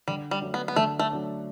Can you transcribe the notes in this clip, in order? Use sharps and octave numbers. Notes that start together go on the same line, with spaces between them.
D3 G3
G3
F#3 A3 D4
B3
B3
D3 A3
A3
F#3 A3 D4